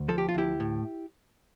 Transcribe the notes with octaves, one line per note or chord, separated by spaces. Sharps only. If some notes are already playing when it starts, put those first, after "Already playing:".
Already playing: D2
F3 A4
G4
F4
D2 E4 G4
A2